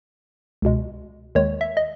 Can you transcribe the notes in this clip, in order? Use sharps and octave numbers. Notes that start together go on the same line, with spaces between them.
C#2 B2 G#3
D#2 D#3 G#3 C#5
E5
D#5